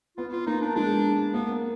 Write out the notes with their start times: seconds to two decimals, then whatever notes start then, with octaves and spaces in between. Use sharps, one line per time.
0.17 B3 F4
0.32 F4
0.47 A#3 D#4
0.61 D4
0.75 G#3 D4
1.33 A#3 B3